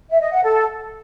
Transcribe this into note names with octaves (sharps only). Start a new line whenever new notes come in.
E5
D#5
F#5
A4